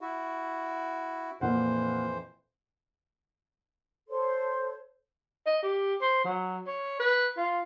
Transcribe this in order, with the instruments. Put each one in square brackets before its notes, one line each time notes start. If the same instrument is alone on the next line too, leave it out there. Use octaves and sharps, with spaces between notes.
[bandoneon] E4 F#4
[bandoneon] F2 E3 C5 [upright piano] A#2 F#5
[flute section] A4 C5 C#5 C6
[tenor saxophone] D#5
G4
C5
F#3
C#5
B4
F4